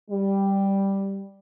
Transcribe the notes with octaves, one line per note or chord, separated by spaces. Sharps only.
G3